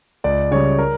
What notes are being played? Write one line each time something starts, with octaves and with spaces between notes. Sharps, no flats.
C#2 D5
C#3 G3 C#5
A#4